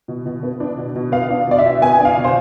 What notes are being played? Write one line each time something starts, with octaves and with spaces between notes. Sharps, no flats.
B2
B2
B3
D4
B2
B2
B3 F5
D4
B2 D5
E5
B2
B3 G#5
D4
F5
B2
C5